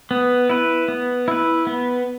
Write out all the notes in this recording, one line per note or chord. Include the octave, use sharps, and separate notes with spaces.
B3
E4 B4
B3
E4 B4
B3